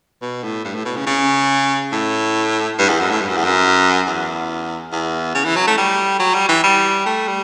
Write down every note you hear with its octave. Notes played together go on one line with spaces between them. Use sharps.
B2
A2
G2
A2
B2
C#3
C#3
A2
G2
E2
F#2
A2
G2
F#2
E2
F#2
E2
E2
C#3
E3
F#3
A3
G3
F#3
G3
E3
G3
A3
G3